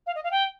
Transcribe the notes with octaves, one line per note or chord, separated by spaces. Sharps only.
F5
D#5
F5
G5